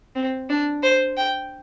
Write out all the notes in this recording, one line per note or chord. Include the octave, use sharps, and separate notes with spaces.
C4
D4
C5
G5